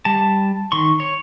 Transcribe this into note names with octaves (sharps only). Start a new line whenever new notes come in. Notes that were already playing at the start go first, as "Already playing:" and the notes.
G3 A5
D#3 C6 C#6
C#5